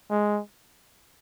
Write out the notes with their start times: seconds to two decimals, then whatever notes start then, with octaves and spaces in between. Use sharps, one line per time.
0.10 G#3